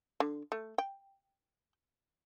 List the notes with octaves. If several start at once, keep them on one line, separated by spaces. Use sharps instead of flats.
D3
A3
G5